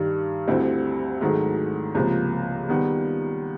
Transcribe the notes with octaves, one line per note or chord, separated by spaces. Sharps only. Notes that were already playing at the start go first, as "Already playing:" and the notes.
Already playing: G2 D#3 G3
D2 D3 G3 C4 E4
G#2 D#3 F#3 A3
C#2 C3 F3 A#3
D#3 G3 B3